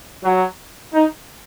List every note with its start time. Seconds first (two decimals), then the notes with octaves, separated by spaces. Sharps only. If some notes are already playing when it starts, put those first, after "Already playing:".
0.24 F#3
0.94 D#4